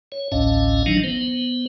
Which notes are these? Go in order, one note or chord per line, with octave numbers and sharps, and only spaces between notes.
C#5
A1 D2 A2 C#4 D#5 F5
D#3 F3 F#3 D4 D#4
B3 C5